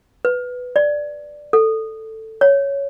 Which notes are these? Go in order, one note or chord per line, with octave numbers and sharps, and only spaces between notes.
B4
D5
A4
C#5